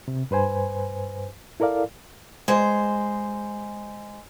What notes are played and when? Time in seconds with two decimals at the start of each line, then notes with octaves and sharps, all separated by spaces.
0.08 C3
0.31 G2 B4 C5 G#5
1.60 E4 A4 A#4 D5 F5
2.48 G#3 C5